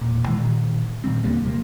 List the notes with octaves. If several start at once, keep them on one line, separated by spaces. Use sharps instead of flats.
E1 A#2
B2 D#3 E3 G#3
A#2 D#3
A#2 D#3 G3 C4
D#2 D3 G3 A#3
C3 F3 A3 A#3